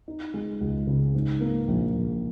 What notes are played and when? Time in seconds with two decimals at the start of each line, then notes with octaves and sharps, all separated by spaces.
0.08 D#4
0.34 G#3
0.61 C#2
0.87 C#3
1.15 G#2
1.41 A#3
1.68 A#1
1.94 A#1